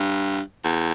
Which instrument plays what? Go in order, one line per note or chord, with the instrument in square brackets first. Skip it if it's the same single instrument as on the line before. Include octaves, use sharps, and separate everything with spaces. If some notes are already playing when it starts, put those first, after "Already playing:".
Already playing: [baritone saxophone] G2
E2